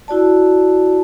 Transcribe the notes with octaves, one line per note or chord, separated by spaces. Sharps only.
E4 F#4 D5 A5